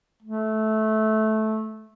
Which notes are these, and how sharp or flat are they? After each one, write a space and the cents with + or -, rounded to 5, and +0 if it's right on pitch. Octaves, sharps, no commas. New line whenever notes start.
A3 -15